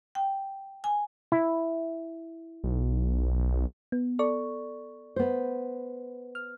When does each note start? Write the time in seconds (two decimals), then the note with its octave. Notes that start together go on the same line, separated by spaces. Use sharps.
0.15 G5
0.84 G#5
1.32 E4
2.64 B1
3.92 B3
4.19 A4 D5 C#6
5.16 B3 C5
6.35 F6